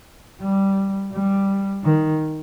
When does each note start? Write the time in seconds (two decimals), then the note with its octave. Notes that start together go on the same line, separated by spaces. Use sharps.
0.42 G3
1.12 G3
1.84 D#3